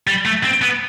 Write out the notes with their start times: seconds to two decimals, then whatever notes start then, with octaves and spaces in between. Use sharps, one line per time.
0.07 G3
0.25 A3
0.44 C4
0.62 B3